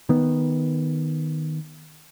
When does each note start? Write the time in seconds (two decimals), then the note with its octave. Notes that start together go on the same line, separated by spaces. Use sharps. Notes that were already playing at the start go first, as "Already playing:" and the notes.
0.09 D#3 B3